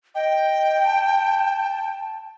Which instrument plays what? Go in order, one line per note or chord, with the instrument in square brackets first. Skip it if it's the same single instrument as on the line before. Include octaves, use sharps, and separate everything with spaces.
[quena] D#5 [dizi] G5
[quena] A5